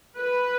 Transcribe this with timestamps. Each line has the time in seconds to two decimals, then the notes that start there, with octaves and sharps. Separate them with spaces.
0.19 B4